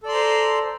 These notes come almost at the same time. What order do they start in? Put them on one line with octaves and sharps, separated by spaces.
A4 D5 C6 A#5 C5